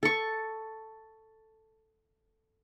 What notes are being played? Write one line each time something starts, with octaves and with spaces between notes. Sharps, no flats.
A4 C#6